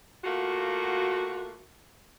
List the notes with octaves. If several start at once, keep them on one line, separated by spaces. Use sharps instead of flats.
A3 A#3 F4 F#4